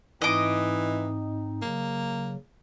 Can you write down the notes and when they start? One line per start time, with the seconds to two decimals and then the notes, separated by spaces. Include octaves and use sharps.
0.22 G#2 E3 C4 D#4 D#5 D6
1.62 C#3 F#3 A#3